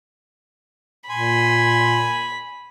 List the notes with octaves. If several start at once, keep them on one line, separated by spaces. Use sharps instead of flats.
A#2 G#5 B5 C6